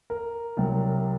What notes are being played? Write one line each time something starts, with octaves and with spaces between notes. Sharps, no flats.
A#4
C2 C3 F#3